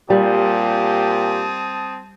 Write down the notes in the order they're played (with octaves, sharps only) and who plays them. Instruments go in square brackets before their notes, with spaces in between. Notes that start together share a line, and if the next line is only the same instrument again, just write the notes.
[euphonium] A#2 [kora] G3 [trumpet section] C4 A5 D#6 [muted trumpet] G4